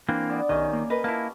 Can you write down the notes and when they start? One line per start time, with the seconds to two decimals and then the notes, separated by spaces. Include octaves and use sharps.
0.08 E3 A#3 C4 D4
0.29 B3 D5
0.49 B1 D#3 C#4 G4 D#5 G#5
0.73 A#3
0.90 A#4 B4 D#5
1.04 A#3 E4 F4 A5